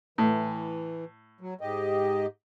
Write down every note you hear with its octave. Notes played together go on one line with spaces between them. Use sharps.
A2 E3
F#3
G#2 G4 D#5